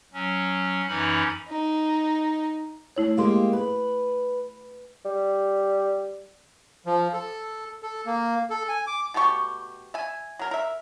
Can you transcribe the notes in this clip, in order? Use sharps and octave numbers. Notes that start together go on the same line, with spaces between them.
F#3 C#4
F#2 E3 C#4 D#4 B5
D#4
A3 E4 C#5
G#3 A#3 G4 F5 C6
B4
G3
F3
A4
A4
A#3
A4
G#5
D6
B2 A3 G4 C#6
E5 G#5
F#3 A#4
A#4 E5